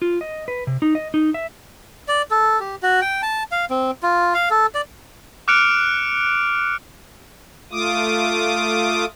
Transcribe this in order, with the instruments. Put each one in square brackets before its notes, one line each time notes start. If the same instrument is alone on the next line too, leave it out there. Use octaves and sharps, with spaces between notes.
[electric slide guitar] F4
D#5
B4
C3
D#4
D#5
D#4
E5
[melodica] D5
A4
G4
F#4
G5
A5
F5
C4
F4
F5
A4
D5
[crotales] D6 F6 F#6 C#7 D7 F7
[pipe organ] A3 F4 D6 D#6